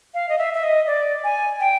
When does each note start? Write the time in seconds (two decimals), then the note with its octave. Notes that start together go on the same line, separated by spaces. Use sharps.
0.14 F5
0.29 D#5
0.38 E5
0.54 E5
0.64 D#5
0.87 D5
1.24 G#5
1.60 G5